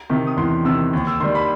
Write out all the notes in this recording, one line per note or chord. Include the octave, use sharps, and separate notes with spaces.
C3 D#3
D#6
E2 C6
C3 D#3 E6
D#2
E6
D#3 G3 C6
B5